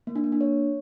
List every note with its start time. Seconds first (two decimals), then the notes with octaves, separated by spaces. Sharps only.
0.07 A#3
0.15 D4
0.24 A#3
0.32 D4
0.41 C#5